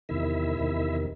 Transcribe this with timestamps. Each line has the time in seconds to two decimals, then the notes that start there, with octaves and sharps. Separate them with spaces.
0.09 E2 C3 D#3 E4 E5
0.57 E2 C3 D#3